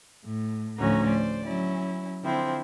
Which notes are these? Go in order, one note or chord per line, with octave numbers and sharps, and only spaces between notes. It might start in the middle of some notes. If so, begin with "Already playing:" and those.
A2
D2 A2 F3 C#4 F#4 A#5
C5 D5
F#3 C#4 E4
D3 F3 C4 E4